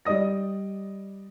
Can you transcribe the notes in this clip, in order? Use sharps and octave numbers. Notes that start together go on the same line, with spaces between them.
G3 D5 D#5 D#6 A#6